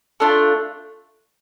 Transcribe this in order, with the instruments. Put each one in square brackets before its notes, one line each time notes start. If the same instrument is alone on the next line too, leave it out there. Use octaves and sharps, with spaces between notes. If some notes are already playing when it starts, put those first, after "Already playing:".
[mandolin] A3 D4 F4